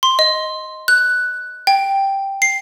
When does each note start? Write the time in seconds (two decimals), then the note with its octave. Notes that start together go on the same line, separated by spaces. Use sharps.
0.03 C6
0.19 D#5
0.88 F#6
1.67 G5
2.42 C7